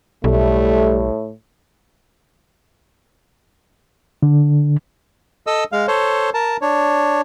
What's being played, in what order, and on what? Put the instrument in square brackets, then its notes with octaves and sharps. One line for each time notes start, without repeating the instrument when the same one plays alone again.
[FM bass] B1 [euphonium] A2 [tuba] G3 [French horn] A3
[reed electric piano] D3
[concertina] A4 D#5 E6
G#3 F5
A4 C5 C#5
A#4 A5
D4 C#5